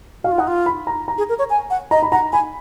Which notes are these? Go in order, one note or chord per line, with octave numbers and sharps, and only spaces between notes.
F#4 F5
F4
D#4 F#5
F4
B5
A#5
A#5
G#4
A#4
C#5
G#5
F#5
D#5 A#5
B5
F#5 A#5
G#5 B5